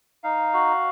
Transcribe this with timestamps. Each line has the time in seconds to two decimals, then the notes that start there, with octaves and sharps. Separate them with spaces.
0.24 D#4 F5
0.54 F#4